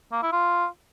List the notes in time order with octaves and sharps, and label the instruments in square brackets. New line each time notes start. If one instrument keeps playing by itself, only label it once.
[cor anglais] A#3
E4
F4